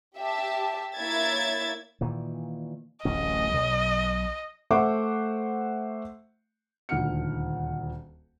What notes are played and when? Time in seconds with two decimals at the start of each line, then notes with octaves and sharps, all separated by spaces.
0.18 G4 E5 A5
0.97 A#3 E4 C#5 E5 G#6 A6
2.01 A#2 D#3 E3
3.05 D1 A1 C#4 D#5
3.53 B1
4.71 A3 C5 E5 F#5 C#6 D6
6.89 D#1 D2 D#3 F#5 F6 C#7